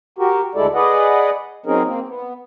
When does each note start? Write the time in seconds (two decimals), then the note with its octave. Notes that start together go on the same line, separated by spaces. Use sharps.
0.18 F#4 G4 A#4
0.55 D2 G#3 E4 A4 D5
0.74 G#4 B4 D5 D#5 F#5
1.66 F#3 C4 C#4 D#4 G#4 A#4
1.85 A#3 C4
2.07 B3